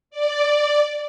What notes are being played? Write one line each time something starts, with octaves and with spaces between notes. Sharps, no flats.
D5